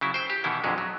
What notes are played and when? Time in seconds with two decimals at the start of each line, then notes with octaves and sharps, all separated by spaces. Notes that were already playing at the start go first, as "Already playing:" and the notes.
0.01 C#3 F#3 E4
0.14 C5 G5
0.30 G4
0.44 B2 D#3 E3 E4
0.64 F2 A#2 D3 F#3 G#3
0.78 F#3